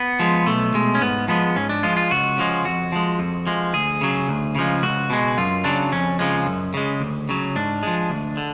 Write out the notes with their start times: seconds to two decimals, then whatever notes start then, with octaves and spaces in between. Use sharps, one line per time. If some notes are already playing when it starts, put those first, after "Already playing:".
Already playing: B3
0.19 F3 G#3
0.46 B1 A3
0.74 B2 G#3
0.95 C#4
1.01 G#2 B3
1.28 F3 G#3 B3
1.56 G#2 C#4
1.69 D4
1.83 F3 G#3 F4
1.97 F4
2.11 C#2 F#4
2.38 C#3 F3 G#3
2.65 F2 F#4
2.92 F3 G#3
3.19 F2
3.47 F3 G#3
3.73 D2 G#4
4.01 C#3 F#3
4.28 D2
4.55 C#3 F3 G#3
4.83 C#2 F#4
5.10 B2 G#3
5.37 F#2 F4
5.64 C#3 F#3 D4
5.92 F2 C#4
6.19 C#3 F3 G#3
6.46 F#2
6.74 C#3 G#3
7.01 D2
7.29 C#3 F#3
7.56 G#2 D4
7.83 F3 G#3
8.10 D2
8.37 D3